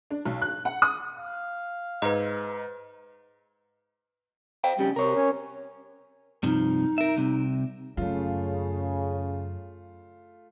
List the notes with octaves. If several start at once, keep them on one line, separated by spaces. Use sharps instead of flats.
D4
B1
F#6
F#5
D#6
F5
G#2 B4 D#5 A#5
C5 F5 G5
F2 C#3 G3
C3 A#4 C#5
C#4
G2 C3 F3 D#4
A#4 E5
C2 C3
F#2 C#3 A3 F4